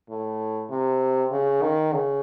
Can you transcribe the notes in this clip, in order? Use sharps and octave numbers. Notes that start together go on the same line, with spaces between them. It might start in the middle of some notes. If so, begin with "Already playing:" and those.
A2
C3
C#3
D#3
C#3